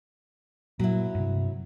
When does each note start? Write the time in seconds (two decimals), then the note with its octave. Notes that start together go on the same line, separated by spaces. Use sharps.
0.79 A#2 F#3 E4
1.15 G2 C3